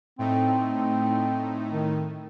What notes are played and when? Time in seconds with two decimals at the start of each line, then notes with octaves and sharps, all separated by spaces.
0.19 A2 A3 C4 D#4
1.70 D#3